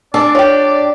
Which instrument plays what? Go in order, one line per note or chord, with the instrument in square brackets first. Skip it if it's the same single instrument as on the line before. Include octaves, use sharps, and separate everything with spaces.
[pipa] C#4 A4 [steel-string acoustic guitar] D4 [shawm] D5
[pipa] F4 G4 [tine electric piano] C#5